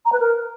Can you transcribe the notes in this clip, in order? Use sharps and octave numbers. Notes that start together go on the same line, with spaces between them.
A#5
B4
A#4